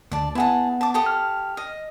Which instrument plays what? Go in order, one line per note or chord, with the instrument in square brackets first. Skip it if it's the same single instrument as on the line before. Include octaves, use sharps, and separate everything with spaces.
[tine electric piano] D2 [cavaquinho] D5 A5
[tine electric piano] B3 F#5 [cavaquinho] E4 G#4 A5
[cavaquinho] A5 D6
G4 A4 D#6
[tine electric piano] F6
[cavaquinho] D#5